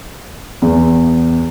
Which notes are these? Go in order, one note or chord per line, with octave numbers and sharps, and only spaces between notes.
E2